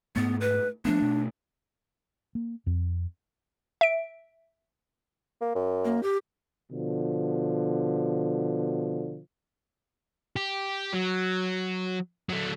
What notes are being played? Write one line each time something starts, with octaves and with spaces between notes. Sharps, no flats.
G#2 A3 B3
B4
F3 A3 B3 D4
B2 A3
A#3
F2
E5 D7
A#3
F#2
A#3
G4
B2 D3 F3
G4
F#3
F#3 A3